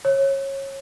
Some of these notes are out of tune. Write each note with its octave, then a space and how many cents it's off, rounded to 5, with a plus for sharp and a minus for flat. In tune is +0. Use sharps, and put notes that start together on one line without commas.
C#5 -25